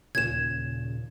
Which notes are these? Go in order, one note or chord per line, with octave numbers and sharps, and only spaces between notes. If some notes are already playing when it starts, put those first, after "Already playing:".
D#2 A#2 C#3 G#6 E7